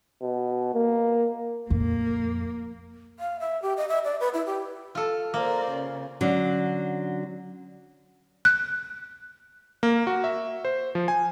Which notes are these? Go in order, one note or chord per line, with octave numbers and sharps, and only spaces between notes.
B2
A#3
F2 A#2 A#3
F5
E5
G4
D#5
E5
D5
B4
E4
G4
F4 A4
A#3 A#4 C5 D5
C#3
D3 F#3 C#4
F#6
A#3
F#4
E5
C5
F3
G#5